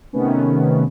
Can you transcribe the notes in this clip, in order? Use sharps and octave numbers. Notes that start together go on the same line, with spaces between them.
C3 D#3 A3 B3 C#4